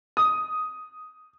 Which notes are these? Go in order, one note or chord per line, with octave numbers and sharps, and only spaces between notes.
D#6